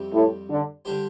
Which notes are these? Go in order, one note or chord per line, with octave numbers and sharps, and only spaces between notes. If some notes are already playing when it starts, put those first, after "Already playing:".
Already playing: F2 C3 G3 C4 G4
A2
D3
D3 G3 D4 G4 C5